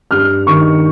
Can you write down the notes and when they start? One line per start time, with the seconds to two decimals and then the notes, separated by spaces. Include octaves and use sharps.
0.11 G2 F6
0.47 D#3 C#6